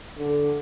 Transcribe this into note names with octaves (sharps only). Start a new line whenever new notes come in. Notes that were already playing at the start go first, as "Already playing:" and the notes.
D3